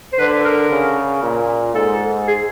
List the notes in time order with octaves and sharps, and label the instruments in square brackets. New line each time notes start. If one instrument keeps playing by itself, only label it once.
[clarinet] C5
[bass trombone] D3 [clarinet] B4
[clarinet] A#4
[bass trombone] C#3
A#2
[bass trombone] G#2 [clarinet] A4
[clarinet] G#4